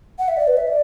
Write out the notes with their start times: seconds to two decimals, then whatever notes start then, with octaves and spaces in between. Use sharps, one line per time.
0.19 F#5
0.28 E5
0.37 D5
0.48 B4
0.57 E5
0.67 D5